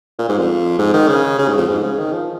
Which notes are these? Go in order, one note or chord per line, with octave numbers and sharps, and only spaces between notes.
A#2
G#2
F2
G#2
D#3
C#3
C#3
G#2
F2
G#2
C#3
D#3
F3